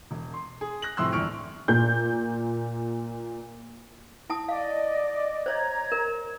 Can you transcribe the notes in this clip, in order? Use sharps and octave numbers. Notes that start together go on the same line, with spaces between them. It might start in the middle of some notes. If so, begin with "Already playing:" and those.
E1
C6
G#4
F#6 A#6 F#7
A2 C3 F3 C6 E6 F#6
G1 E2 D5 C#6 F6 D7
A#2 G6
E4 A5 D#6
D5 D#5 F5
C5 C#5 D#5 A#5 G#6
A#4